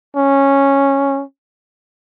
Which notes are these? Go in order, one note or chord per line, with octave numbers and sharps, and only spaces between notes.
C#4